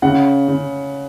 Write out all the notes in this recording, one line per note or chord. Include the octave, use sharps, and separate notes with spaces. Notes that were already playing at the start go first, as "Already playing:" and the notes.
C#3 F#5
C#3